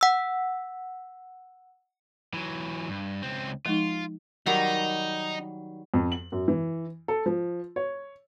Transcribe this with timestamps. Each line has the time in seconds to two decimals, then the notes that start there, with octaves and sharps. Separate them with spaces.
0.01 F#5 E6
2.34 E3 F#3
2.89 G2
3.22 C#2 C4
3.66 F3 G#3 D#4 F4
4.46 D#3 F#3 G3 D#4
5.94 F2
6.12 F#7
6.32 F#2
6.48 E3
7.08 A4
7.26 F3
7.76 C#5